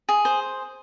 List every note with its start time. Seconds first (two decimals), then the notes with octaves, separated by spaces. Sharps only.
0.09 G#4
0.25 C5